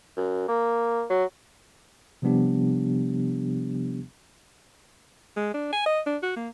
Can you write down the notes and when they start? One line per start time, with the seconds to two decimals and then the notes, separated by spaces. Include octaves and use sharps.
0.17 F#2
0.48 A#3
1.10 F#3
2.22 C3 F3 G3 B3 D4 G4
5.37 G#3
5.54 D4
5.73 G#5
5.86 D#5
6.07 D4
6.23 F#4
6.36 A#3